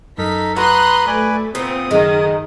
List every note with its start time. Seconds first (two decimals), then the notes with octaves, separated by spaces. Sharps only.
0.18 F#2 D#4 A4 A#4 B6
0.57 F#4 B4 A#5 C6 D#6 F#6
1.07 A3 B4 D5 G#5
1.55 A#2 B3 C4 D#6
1.91 F#1 D#3 G#3